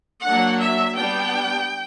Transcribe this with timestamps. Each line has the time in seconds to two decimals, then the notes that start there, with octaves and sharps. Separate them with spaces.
0.24 F#3 A#3 D4 F#5
0.61 E5
0.96 G3 B3 D4 G5